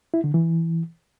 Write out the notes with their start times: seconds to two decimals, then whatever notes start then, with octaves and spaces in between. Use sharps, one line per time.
0.14 E4
0.24 D3
0.34 E3